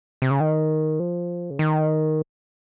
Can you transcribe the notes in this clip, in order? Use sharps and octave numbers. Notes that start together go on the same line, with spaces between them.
C3
C#3
D#3
F3
C#3
D#3